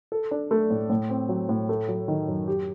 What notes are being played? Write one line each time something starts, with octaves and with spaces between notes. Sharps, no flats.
A4
D4
A3
A2
A2
C4
F#3
A2
A3
F#3
D#3
F#2
G4